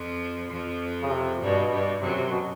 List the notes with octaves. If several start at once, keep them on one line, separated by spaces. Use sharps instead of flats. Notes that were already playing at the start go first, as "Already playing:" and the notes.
Already playing: F2 F3
F2 F3
C#3
C3
G2 B2 G3
G2 G3
F#2 C3 F#3
C3
B2